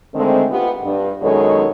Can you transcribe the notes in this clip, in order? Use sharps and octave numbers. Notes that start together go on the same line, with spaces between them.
D3 D#3 G#3 A3 C4
B3 F4 G4
G2
F#2 B2 D#3 G#3 A4 C#5